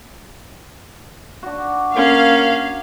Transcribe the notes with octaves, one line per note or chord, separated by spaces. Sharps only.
D4 F#4
A#3 C#4 F5